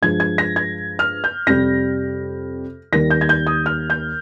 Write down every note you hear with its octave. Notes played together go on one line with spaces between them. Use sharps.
G2 F3 G#3 G#6
G#6
A#6
G#6
F6
G6
F2 C3 G3 A#6
D#2 D#3 G3 A#6
G6
G#6
G6
D#6
F6
G6